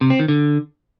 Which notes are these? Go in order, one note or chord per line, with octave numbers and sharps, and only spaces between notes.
C3
C4
D#3
D3